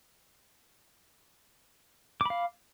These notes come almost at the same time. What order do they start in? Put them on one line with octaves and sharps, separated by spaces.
D6 B5 F5